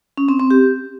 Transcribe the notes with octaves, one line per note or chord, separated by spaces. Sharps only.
C#4
C4
C4
G4